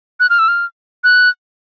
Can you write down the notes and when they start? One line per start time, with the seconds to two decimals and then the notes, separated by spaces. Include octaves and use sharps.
0.20 F#6
0.30 F6
0.39 E6
0.48 F6
1.04 F#6